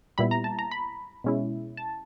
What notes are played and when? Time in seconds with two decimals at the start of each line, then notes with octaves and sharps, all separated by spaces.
0.18 A#2 G3 B3 E4 B5
0.31 A#5
0.44 A5
0.59 A#5
0.71 B5
1.24 B2 G#3 C#4 E4
1.77 A5